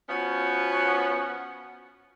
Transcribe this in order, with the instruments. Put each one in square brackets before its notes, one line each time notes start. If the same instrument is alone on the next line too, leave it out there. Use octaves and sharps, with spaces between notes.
[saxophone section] F3 B3 C#4 F#4 F#5